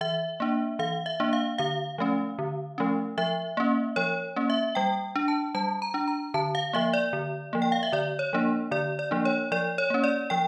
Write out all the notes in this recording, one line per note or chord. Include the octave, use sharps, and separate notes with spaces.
E3 E5
A#3 D4
E3 F5
E5
A#3 D4
F5
D3 F5
F3 A3 C#4
D3
F3 A3 C#4
F3 E5
A#3 C#4
F3 C#5
A#3 C#4
E5
G3 G5
D4
A5
G3 A5
A#5
D4
A#5
D3 A5
F5
F3 A#3 E5
D5
D3
F3 A#3
G5
F5
E5
D3 D5
C#5
F3 A#3 D4
D3 D5
D5
F3 A#3 D4
C#5
F3 D5
C#5
A#3 C#4
D5
F3 G5